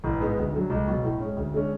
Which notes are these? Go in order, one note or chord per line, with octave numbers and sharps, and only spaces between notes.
A1
G#2 G#3 B3
D2
D3 F#3
C#2
B2 F#3
A2
G#3 C#4
D2
D3 G#3 C#4